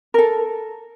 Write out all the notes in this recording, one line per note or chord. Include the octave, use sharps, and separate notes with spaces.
A4 A#4